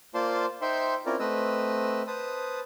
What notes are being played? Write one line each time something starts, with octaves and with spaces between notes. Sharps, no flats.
A#3 F4 C5 D5 A5 C6
D#4 C5 E5 G5 C6
C4 C#4 E4 F4 A#4 D5
A3 C4 B4 D#5 E6
B4 C5 A5 D#6